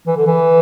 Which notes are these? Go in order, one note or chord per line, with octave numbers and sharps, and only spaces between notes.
E3
D3
E3